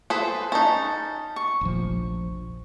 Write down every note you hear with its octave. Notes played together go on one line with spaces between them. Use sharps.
G#4 A4 B4 C5 B5
C#4 D#4 A5
C#6
F1 A#1 F3